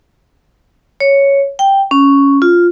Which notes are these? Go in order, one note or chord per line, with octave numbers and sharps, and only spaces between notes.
C#5
G5
C#4
F4